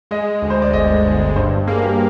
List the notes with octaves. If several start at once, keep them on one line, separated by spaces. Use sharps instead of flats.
G#3 D#5
D2
C5
D5
G1 D#5
G1
G2 C5
A#3 G#4
G4